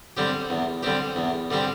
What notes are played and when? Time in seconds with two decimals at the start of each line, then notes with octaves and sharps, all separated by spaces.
0.17 D3 G3 C4 G4
0.50 E2
0.83 D3 G3 C4 G4
1.16 E2
1.51 D3 G3 C4 G4